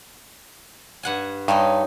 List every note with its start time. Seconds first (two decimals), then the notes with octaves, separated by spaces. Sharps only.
1.03 G2 F#5 G#5
1.48 G2 D#4 C#5 D#5